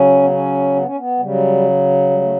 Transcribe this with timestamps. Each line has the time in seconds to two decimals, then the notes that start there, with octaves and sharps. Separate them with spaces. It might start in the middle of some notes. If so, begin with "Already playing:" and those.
Already playing: C#3 F#3 C#4
0.22 B3
0.30 C#4
0.75 B3
0.85 C#4
0.97 B3
1.19 C#3 F#3 G3
2.10 G3
2.21 A3